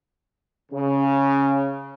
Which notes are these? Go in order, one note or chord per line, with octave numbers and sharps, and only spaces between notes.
C#3